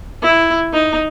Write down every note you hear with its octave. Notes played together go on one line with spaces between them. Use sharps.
E4
D#4